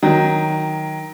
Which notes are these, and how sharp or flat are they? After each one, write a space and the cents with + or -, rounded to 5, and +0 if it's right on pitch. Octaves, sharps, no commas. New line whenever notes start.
D#3 +0 F#3 +0